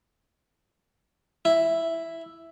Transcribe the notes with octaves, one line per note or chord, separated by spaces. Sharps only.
E4